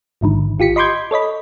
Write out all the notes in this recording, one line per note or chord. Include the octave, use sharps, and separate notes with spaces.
A1 G#2 D3 D#3
A1 F4 G4 B6 C#7
D#5 B5 C6 D6 G6 G#6
A4 C#5 D#5 B5